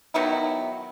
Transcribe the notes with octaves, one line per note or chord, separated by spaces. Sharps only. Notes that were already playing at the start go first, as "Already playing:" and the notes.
D#3 F#3 B3 E4